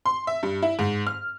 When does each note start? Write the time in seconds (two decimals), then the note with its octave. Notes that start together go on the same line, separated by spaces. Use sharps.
0.06 C6
0.27 E5
0.43 G2
0.62 E4
0.79 G#2
1.07 F6